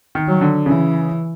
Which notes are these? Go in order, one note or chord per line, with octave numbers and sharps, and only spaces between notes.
D#3
F#3
D3
C#3 E3